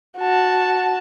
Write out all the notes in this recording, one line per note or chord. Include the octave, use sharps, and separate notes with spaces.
F#4 A5